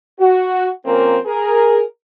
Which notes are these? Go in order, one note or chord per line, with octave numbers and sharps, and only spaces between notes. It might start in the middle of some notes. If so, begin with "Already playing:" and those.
F#4
F3 A#3 C4 C#4 A#4
G#4 A#4